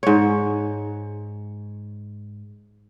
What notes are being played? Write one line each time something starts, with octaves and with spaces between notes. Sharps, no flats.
G#2 C#5